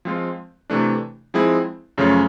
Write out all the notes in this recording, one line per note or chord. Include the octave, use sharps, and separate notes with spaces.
F3 G#3 C4 F4
C3 E3 A3 D4
F3 G#3 C4 E4 G#4
F#2 C#3 F3 A3 C#4